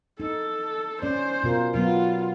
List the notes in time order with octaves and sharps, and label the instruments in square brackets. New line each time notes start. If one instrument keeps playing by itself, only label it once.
[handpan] D#4 [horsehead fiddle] A4
[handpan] C#4 D5 [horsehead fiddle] C5
[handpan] B2 F4 A#4
[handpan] B2 F#3 B3 [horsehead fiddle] F4